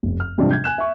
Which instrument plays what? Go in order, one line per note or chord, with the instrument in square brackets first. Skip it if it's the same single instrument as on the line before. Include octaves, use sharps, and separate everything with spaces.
[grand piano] F1
F6
G#2 C3 F3 G3 D4
G6 G#6
G#5 F#6 E7
E5 C#6